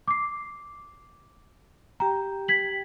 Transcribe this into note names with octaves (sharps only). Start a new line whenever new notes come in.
D6 C7
G4 G5 A#5
G#6 B6 F#7